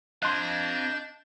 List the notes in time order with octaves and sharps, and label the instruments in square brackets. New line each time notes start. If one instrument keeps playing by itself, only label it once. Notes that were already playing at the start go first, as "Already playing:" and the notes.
[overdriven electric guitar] C4 F5 [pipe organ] D4 G6 A6 [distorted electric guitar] D#5 [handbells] C6 F#6